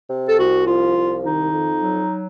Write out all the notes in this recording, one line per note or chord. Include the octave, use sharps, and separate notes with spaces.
C3
A4
C2 F#4
F3 F4
C2
D#3 D#4
F2
F#3